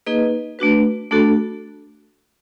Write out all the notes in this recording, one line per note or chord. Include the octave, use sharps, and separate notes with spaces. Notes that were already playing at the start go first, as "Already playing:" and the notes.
A#3 D#4 G#4 B4 D#5
A3 D4 F#4 B4
A3 D4 F#4 A4